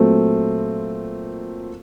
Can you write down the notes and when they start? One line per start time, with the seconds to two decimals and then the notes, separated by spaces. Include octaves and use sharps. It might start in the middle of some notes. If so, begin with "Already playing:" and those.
Already playing: A#2 F#3 A3 C4